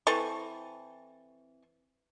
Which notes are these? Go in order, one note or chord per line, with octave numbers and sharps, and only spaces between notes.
E3 C4 A4 C#6